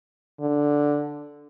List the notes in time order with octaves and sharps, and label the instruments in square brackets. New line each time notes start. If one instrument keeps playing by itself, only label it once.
[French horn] D3